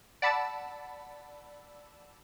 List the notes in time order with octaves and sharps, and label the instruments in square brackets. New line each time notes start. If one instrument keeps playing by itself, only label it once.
[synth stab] D5 F#5 A5 B5 E6 A6